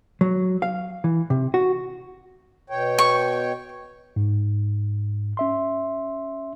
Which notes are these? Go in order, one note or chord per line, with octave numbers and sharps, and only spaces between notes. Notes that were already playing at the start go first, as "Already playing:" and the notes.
F#3
F5
E3
C3
F#4
B2 C#5 G5
C#6
G#2
C#4 E5 C6